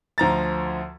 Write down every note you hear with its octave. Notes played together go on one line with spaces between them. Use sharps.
D2 F3 A#5 A6